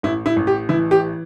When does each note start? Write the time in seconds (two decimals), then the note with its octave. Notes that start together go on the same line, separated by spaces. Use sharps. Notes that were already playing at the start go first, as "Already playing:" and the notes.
0.03 A1 E4
0.26 E4
0.36 A1
0.47 G4
0.69 E3 E4
0.91 G4